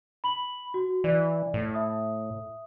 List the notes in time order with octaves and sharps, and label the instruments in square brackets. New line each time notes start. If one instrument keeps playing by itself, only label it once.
[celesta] B5 F#7
F#4
[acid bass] E3 [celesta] D5
[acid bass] A2
[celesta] E5 D#6